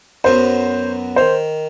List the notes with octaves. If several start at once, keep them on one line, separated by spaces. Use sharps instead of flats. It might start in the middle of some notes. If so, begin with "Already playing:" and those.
F#2 F#3 B3 C5
D#3 C5